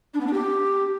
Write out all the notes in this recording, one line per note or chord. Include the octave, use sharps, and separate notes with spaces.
D4
B3
D4
G4